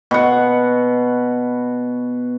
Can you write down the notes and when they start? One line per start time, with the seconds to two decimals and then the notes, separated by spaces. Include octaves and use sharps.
0.11 B2 F#5